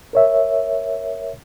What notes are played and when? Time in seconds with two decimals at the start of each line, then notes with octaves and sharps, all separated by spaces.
0.13 A#4 C#5 E5